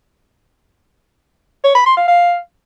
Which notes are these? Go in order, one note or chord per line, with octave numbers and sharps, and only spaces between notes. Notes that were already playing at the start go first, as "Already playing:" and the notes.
C#5
B5
C6
F5
F5